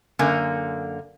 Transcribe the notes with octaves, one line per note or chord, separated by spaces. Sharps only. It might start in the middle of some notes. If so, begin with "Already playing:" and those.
F#2 D3 A#3 G#5